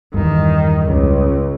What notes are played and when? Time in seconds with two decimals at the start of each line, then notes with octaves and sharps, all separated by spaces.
0.14 E2 G2 D#3
0.86 C#2